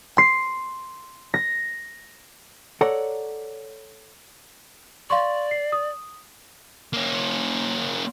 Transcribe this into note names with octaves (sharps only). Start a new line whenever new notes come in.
C6 C7
A#6
A4 C#5 D5 F#5 A#5
D5 F5 C6 C#6
C7
D#6
A#3 C#4